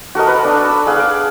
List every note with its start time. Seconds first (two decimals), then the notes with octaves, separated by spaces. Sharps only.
0.15 F#4 A4 A#4 D#5
0.27 B4 F#5
0.44 D4 F#5
0.69 E6
0.86 G#4 F5 F#5
1.00 D6